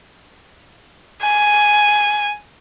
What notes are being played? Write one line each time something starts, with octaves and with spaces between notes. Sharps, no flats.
G#5